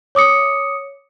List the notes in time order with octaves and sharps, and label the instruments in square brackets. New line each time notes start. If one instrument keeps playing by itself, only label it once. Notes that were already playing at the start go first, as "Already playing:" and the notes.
[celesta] C#5 D6 D#6 C#7